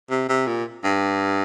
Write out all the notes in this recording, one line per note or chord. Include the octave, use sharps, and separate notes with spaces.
C3
C3
A#2
G2